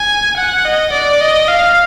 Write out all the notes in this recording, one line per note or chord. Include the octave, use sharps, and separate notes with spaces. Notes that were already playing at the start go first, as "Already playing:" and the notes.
Already playing: G#5
F#5
D#5
D5
D#5
F5